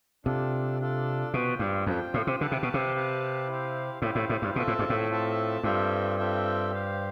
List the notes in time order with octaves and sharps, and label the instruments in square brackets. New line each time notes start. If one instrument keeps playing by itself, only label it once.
[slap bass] C3 [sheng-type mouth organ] D4 F4 A4 D5
[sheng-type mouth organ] D4 F4 A4 D5
[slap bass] B2 [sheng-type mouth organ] F4 C5 G5
[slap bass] G2
[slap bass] F2 [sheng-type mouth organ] F4 C5 G5
[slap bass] A2
C3
[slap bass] D3 [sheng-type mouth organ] G4 B4 F5 A5
[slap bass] C3
B2
C3
[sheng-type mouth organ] G4 B4 F5 A5
E4 G4 C5 F5
[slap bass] A2 [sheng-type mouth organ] E4 G4 C5 F5
[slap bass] A2
A2
G2
[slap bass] B2 [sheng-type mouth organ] C4 F4 A4 E5 A5
[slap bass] A2
G2
A2
[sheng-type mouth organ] C4 F4 A4 E5 A5
[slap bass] G2 [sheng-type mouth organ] C4 F4 A4 E5 G5
[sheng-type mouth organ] C4 F4 A4 E5 G5
G4 C5 F5